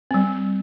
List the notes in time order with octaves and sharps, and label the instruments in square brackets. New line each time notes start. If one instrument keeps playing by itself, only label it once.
[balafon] G3 C4